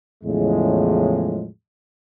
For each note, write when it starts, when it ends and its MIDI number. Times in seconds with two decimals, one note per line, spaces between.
0.24 1.47 40
0.24 1.47 45
0.24 1.47 49
0.24 1.47 53
0.24 1.47 56